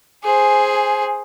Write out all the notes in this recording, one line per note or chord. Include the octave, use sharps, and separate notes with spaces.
G#4 C5 G#5